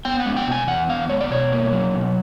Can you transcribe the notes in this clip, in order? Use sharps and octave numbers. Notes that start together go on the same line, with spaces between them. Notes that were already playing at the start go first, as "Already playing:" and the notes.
B3 G5
F#5
G#3
G5
B2
G#5
E2 F#5
B3 F5
G#3 C#5
D5
B2 C#5
A#3
F#3
B2